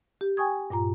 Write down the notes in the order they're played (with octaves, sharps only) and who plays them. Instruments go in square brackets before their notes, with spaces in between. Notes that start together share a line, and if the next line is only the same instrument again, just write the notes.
[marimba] G4
G5 G#5 C#6 D#6 G#6
G2 A#2 F4 A#5